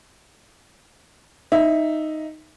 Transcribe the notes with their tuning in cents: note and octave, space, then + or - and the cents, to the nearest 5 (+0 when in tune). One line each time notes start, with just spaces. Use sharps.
D#4 +0 E5 +0